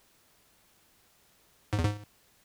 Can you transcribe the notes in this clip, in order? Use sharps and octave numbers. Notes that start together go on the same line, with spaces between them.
G#2
E2
G#2